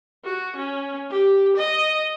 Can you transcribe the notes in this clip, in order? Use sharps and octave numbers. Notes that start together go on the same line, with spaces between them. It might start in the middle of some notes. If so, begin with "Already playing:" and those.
F#4
C#4
G4
D#5